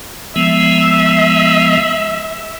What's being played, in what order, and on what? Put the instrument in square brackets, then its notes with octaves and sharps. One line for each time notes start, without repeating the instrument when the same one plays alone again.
[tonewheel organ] F3 G#3 B3 [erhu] E5